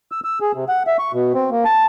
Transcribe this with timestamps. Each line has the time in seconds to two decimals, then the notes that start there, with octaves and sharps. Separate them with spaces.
0.12 E6
0.24 E6
0.41 G#4
0.54 C3
0.69 F#5
0.87 E5
0.99 C#6
1.13 B2
1.34 C4
1.51 A#3
1.65 A5